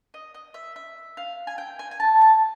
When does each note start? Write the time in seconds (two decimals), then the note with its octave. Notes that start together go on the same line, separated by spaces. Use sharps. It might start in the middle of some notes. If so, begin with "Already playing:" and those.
0.14 D#5
0.34 D#5
0.54 E5
0.76 E5
1.17 F5
1.47 G#5
1.58 G5
1.79 G#5
1.91 G#5
2.00 A5
2.21 A5